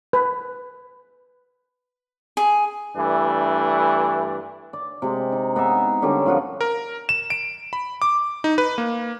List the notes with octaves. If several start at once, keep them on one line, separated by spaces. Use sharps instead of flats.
B4
G#4
G2 E3 A3 D4
D5
C3 G#3
D#4
B3 D#4 G#4 E5
D3 G3 C#4 A#4
F3 C4 F4 F#4
A#4
E7
D7
B5
D6
D#4
B4
A#3